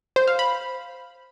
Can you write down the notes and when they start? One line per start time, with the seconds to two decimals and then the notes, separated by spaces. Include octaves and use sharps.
0.16 C5
0.28 F5
0.39 B5